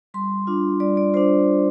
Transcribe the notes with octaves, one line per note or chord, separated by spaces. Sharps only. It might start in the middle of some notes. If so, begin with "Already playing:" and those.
G3 C6
D4 F4
G3 D5
D5
D4 F4 C5